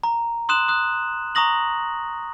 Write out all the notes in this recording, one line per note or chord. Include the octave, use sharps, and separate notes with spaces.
A#5
C6 D#6 F#6 E7 F#7
D#6 F#6
A#5 C#6 D#6 A#6 F#7